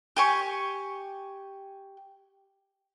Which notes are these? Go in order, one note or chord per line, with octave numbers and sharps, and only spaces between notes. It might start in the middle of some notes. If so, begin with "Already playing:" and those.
G4 G#5 C#6